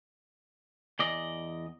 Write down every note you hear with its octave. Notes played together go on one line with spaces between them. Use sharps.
E2 D5 D#5